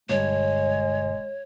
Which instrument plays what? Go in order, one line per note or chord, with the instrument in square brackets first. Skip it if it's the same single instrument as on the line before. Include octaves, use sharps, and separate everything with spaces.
[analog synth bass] E1 [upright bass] G2 D3 [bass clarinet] G#3 [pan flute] C#5